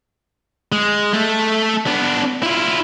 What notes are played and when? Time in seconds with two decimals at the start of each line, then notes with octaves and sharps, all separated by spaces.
0.72 G#3
1.13 A3 A4
1.87 B3 D4
2.43 E4 F4